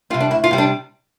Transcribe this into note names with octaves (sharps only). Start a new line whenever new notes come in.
C3 G3 F4
D4
D2 E4
F4
C3 G3
D4